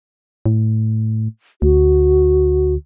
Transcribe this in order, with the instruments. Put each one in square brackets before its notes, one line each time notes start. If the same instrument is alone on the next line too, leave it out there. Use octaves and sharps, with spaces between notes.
[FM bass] A2
[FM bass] D2 [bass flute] F#4